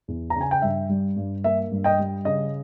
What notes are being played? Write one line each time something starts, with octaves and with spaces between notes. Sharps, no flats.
E2
A#5
C#3
G#5
G5
G2 E5
G3
G2
A#3 E5
G2
D#5 G5
G3
C#3 D#5